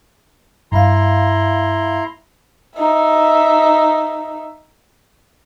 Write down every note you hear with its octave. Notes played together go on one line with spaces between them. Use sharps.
G2 E4 F5 A#5 C6
D#4 E5